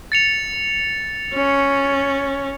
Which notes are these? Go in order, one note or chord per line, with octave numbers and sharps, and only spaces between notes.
A6 C#7 F7
C#4